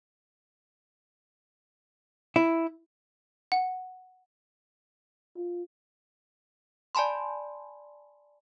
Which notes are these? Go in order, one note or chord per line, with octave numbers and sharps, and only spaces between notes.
E4
F#5
F4
D5 G#5 A5 B5 C6